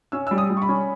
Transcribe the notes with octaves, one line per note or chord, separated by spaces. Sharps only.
C#4 E6
G3 E6
D#6
G3
C#6
B5
C#4